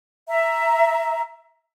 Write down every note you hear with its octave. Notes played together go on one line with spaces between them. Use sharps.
E5 A#5